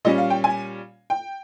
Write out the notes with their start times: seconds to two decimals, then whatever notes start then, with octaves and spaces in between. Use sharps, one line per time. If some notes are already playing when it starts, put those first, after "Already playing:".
0.05 A#2 G3 C#4 D#5
0.18 F5
0.30 G5
0.44 G#5
1.10 G5